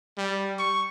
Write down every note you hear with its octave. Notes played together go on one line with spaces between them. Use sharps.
G3
C#6